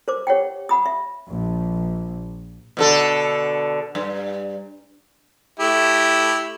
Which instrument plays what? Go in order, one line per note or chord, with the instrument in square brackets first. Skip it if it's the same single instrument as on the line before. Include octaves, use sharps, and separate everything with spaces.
[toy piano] A#4 C5 D6
G4 C#5 F#5 G5
F#5 B5 D#6
E5
[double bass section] A#1
[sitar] B2 D3 A4
G2
[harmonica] A3 E4 G4